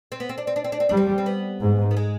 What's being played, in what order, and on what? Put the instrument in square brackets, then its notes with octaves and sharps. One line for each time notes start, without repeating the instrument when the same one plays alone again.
[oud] C4
B3
C4
D4
C4
D4
C4
D4
C4
[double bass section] G3 [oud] D4
[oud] C4
C4
B3
[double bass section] G#2
[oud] B3
G#3